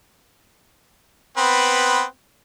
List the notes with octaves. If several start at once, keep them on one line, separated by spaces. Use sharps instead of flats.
B3 C4 B4